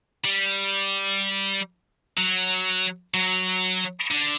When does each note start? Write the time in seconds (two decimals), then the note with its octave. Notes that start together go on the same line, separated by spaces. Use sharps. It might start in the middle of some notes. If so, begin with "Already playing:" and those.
0.25 G3
2.18 F#3
3.14 F#3
4.11 D3